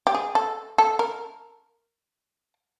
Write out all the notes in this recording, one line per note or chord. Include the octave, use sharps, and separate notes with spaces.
G4
G#4
A4
A4
A#4